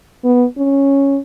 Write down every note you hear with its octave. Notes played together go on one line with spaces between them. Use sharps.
B3
C#4